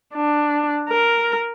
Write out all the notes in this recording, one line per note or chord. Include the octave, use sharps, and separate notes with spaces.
D4
A#4